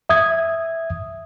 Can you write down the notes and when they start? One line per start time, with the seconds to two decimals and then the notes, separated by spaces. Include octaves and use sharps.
0.09 E5 D#6 G#6